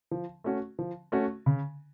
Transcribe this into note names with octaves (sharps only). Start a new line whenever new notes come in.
F3
A3 C#4 F#4
F3
A3 C#4 F#4
C#3